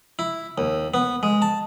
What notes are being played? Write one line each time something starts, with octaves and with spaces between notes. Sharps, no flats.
E4
D#2
B3
G#3
A5